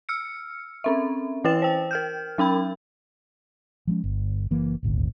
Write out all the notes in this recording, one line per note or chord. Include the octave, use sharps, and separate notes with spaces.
E6 F6 C#7
C4 C#4 E5
E3 E4 B4 G5 A6 E7
C5 G5
A#4 F6 G6
F#3 C#4 G5 B5
F3 G#3 C#4
G1
F#1 E3 A#3
D#1 G#1 D2